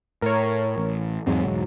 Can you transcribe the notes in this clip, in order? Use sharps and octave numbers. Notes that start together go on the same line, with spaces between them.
A2 A#4 C#5
A1
E2 G#2 F#3 C4
E1 C2